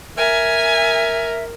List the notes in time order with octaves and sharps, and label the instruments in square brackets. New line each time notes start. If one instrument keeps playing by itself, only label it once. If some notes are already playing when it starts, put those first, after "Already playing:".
[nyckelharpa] A#4 [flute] E5 [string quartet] G#5